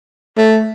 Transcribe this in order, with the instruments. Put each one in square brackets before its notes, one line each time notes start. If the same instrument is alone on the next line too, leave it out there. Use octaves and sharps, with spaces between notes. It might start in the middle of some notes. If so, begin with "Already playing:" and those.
[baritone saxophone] A3